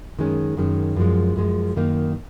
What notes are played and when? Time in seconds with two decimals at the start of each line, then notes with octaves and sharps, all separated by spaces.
0.19 F#2 D#3 G#3 C#4
0.57 F#2 D#3 G#3 C#4
0.96 F#2 F3 G#3
1.36 F#2 F3 G#3
1.76 F#2 D#3 A#3 D#4